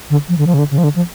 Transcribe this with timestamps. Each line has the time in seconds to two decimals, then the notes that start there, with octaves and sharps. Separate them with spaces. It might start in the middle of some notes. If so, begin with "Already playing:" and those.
0.10 D3
0.29 F3
0.38 D3
0.47 F3
0.54 C#3
0.59 D3
0.71 C#3
0.78 F3
0.84 D3
0.96 F3